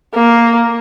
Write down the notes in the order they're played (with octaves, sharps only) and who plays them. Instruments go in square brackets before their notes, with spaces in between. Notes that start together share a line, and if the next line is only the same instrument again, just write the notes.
[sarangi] A#3